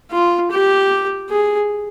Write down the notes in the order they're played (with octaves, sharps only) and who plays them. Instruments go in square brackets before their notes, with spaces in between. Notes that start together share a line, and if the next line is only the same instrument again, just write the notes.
[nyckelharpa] F4
G4
G#4